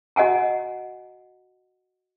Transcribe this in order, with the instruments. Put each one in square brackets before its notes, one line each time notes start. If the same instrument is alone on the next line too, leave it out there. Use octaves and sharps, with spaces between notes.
[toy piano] F#4 D#5 F#5 G#5 A#5